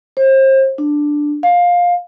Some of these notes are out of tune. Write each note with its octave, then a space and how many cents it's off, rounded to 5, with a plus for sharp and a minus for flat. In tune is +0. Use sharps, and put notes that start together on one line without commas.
C5 +35
D4 +5
F5 +15